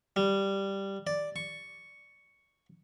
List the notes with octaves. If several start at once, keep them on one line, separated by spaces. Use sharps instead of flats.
G3
D5
C#6